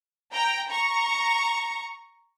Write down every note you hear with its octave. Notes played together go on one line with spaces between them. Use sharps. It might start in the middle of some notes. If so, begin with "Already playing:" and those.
G5 A#5
A#5 C#6